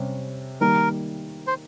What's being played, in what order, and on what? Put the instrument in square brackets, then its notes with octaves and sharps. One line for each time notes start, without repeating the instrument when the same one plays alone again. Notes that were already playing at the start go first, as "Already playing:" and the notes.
Already playing: [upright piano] C3 G3 C#4
[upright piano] D#3 G3 A#3 [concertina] A#4
[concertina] C5